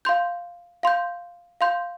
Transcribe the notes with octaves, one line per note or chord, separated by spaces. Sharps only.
F5 C6 G6
F5 C6 G6
F5 C6 G6